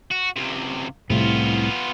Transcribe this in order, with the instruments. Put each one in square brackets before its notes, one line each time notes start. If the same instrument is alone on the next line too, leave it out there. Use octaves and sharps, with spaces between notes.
[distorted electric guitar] F#4
C#2 C3
[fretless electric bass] C2 A2 C3 [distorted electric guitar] B3 F4